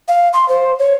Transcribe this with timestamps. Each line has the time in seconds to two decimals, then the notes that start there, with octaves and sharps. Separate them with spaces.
0.08 F5
0.33 C6
0.48 C5
0.79 C#5